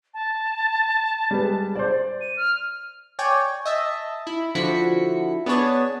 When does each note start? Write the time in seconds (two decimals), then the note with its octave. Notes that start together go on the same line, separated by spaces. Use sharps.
0.14 A5
1.31 G3 G#3 B4
1.75 C5 D5
2.21 D#7
2.37 F6
3.19 C#5 D5 G5 G#5
3.65 D#5 E5 A5
4.27 E4
4.55 D3 F3 E4 F#4 B6 C#7
5.46 B3 D4 G#4 B4 C#5 A5